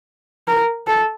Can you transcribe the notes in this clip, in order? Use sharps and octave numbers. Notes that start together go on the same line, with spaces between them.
A#4
A4